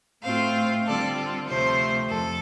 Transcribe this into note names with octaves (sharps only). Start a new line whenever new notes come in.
A2 A3 C4 F4 C5 F5
D3 G3 C4 F4 A4 D5
A4
D2 C3 F3 A3 C5
F2 A4